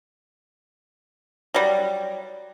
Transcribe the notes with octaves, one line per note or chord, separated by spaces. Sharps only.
F#3 G3